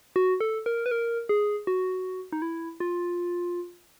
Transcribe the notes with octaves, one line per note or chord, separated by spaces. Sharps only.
F#4
A4
A#4
B4
A#4
G#4
F#4
D#4
E4
F4